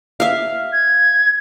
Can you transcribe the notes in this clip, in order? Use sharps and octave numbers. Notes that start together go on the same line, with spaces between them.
E5 F5
G#6